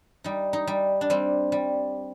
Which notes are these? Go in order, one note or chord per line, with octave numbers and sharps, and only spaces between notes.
G3 D#4
D#4
G3
D4
G3 C4
G3